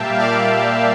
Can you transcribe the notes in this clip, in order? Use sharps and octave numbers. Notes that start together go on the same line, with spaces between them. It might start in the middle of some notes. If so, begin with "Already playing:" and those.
Already playing: A#2 G3 A#3 E5 F5 G5 A5
D5 F5